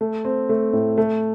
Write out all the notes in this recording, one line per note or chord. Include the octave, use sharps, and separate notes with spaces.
A3
C4
A3
A2
A3